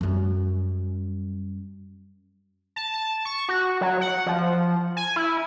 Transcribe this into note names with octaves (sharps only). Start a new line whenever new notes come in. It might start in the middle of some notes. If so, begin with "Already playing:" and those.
F#2 G3
A5
A5
C#6
F#4
F#3
F#5
F3
G#5
E4